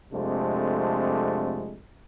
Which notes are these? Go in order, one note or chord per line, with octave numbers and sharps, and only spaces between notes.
F2 C3 G#3 A3 D4